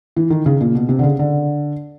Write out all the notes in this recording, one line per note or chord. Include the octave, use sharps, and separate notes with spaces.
E3
D#3
C#3
A#2
B2
C3
D3
C#3
D3